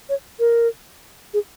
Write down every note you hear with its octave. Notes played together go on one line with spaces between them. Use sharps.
C#5
A#4
G#4